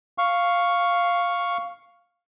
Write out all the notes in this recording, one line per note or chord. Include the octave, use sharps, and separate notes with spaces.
F5 C#6